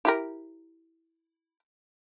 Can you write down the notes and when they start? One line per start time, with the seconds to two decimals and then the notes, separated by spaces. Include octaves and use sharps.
0.05 E4 G4 A#4